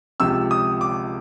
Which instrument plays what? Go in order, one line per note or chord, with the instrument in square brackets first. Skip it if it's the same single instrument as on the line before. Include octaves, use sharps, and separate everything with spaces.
[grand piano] C#2 C3 F3 E6
D#6
D6